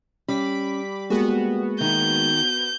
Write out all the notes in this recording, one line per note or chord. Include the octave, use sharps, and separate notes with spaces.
G3 C#4 B5 D6 B6
G#3 A#3 B3 F#4 G#4
D#3 G6